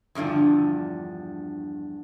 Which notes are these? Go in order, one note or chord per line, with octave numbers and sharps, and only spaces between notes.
E2 G2 D3 F3